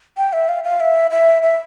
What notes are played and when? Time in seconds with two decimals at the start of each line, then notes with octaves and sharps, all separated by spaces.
0.18 G5
0.33 E5
0.49 F5
0.64 F5
0.80 E5
1.11 E5
1.42 E5